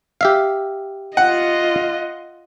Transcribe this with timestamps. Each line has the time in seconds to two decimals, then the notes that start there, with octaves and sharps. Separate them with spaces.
0.21 G4 E5 F5
1.17 F4 D#5 F#5